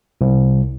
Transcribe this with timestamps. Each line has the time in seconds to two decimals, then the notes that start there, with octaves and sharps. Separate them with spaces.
0.21 C2